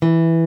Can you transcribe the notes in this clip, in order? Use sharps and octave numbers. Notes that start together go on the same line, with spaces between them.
E3